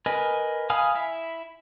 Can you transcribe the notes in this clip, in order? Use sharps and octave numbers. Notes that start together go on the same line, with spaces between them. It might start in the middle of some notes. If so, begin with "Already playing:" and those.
A#4 B4 D#5 G#5
F5 G#5 B5 D#6 F6
E4 E5